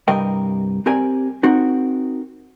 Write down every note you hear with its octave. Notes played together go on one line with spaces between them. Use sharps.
C2 G2 G3 A#4 D#5 G5
C4 G4 A#4 D5 G#5
C4 D#4 F#4 A#4